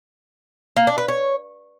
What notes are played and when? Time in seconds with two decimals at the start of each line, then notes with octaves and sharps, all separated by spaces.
0.77 A#3
0.87 D4
0.98 B4
1.08 C#5